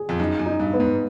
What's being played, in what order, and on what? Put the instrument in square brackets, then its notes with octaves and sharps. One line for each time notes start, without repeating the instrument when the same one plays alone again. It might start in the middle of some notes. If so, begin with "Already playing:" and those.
Already playing: [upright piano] G#4
[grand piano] F2
[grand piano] F#2 [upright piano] D#4
[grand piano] F#2
[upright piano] D#4
[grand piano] G2
[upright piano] B3
[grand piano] G#2